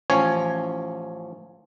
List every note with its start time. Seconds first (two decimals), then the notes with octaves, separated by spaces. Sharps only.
0.10 A1 F3 C#4 C#5 G#5